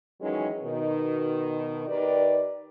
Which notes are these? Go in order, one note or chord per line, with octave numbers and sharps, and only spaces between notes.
D#3 E3 F#3 G#3 C#4 D#4
B2 D#3
D#3 G4 B4 D5